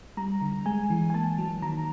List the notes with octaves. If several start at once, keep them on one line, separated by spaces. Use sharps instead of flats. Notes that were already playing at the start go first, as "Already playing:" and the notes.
G3 A#5
D3
G#3 G#5
E3
G#5
A#3 A5
F#3
D#3 A#5